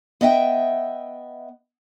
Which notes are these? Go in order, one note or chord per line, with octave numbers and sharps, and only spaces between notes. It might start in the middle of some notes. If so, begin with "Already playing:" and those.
B3 D#5 E5 G5